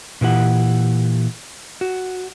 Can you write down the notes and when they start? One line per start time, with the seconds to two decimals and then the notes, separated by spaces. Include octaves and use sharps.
0.21 A#2 E3 G4 F#5
1.81 F#4